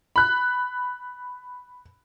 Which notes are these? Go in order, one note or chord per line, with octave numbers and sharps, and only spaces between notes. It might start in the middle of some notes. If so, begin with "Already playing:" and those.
B5 F#6